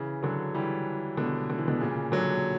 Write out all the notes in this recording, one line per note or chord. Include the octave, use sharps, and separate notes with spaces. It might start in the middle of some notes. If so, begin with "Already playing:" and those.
Already playing: C#3 E3
D3 F#3
E3 G3
B2 D3
D3
E3
B2 D3
A#2 C#3
D3 F#3